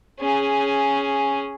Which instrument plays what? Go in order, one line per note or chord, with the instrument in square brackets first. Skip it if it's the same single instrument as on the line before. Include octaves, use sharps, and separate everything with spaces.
[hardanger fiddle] C#4 G#4